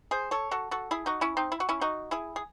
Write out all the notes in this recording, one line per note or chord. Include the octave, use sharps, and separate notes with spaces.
G#4 C5
A4 C#5
F#4 A4
F#4 A4
E4 G#4
D#4 F#4
C#4 E4
C4 D#4
E4
F#4
C#4 E4
D#4 F#4
E4 G#4
G#4